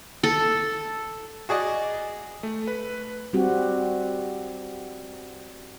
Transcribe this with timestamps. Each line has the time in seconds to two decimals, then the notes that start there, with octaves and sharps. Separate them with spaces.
0.23 A4
1.49 F#4 G#4 D5 D#5
2.43 A3
2.68 B4
3.33 G3 C4 F#4 G4